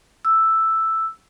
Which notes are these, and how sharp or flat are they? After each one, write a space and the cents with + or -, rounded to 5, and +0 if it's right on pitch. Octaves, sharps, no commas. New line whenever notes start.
E6 +0